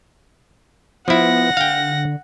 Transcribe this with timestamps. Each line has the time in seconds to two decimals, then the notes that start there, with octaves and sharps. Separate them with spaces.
1.08 F3 B3 E4 F#5 A#6
1.57 D3 F5 G5